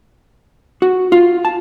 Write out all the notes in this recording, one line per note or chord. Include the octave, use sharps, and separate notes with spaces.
F#4
F4
A5